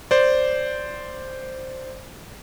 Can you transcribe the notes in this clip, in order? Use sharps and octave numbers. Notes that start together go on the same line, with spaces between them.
C5 D5